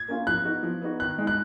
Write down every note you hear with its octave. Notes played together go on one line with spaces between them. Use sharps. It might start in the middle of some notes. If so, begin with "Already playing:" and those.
Already playing: G#6
A#3 C#4 F4
F3 F#6
B3 D#4 F#4
F3
B3 D#4 F#4
D#3 F#6
G#3 D#4
F#6